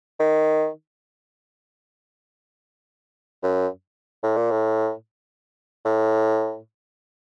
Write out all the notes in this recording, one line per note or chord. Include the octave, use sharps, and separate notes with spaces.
D#3
F#2
A2
A#2
A2
A2